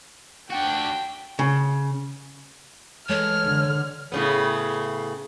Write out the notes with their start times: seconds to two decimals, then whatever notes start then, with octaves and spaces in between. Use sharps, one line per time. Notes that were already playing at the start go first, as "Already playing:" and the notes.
0.50 D4 F#4 G5
1.39 C#3
3.09 E3 G#3 A3 C#5 F6
3.45 D3
4.12 A2 C#3 B3